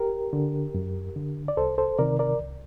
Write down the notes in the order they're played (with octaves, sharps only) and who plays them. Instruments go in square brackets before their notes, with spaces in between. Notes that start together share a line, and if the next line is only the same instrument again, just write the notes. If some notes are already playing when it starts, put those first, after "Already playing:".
Already playing: [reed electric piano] G4 A#4
D3
F#2
D3
D5
C2 A4 C5
A4 C5
C3 D#3 A#4 D5
A#4 D5
C2